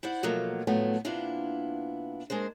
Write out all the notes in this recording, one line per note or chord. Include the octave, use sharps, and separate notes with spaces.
E4 C5 D5 F#5
B2 F3 F#3 A3 A#3 F4
A2 F3 F#3 A3 B3
C3 A#3 B3 D4 E4 F4
G#3 A#3 D4 C5